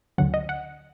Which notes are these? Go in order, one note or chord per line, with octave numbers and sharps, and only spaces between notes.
D2 D3 F#3 F#5
D#5
F#5